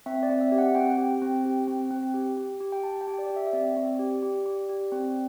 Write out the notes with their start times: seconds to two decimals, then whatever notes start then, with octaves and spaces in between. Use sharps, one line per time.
0.06 C4 E5
0.23 D5
0.29 C4
0.41 E5
0.52 G4
0.58 F#5
0.75 C4 G5
0.98 G4
1.22 C4
1.45 G4
1.68 C4
1.91 C4
2.14 G4
2.37 G4
2.60 G4
2.72 G5
2.83 G4 A5
3.01 G5
3.07 G4
3.19 D5
3.30 G4
3.36 E5
3.47 E5
3.53 C4 D5
3.77 C4
3.99 G4
4.23 G4
4.46 G4
4.69 G4
4.92 C4